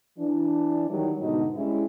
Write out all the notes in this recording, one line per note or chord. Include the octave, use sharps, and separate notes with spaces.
E3 D4
D#3 F#3 G3
G#2 B2 D3 B3 D#4 F#4
G3 G#3 C#4 E4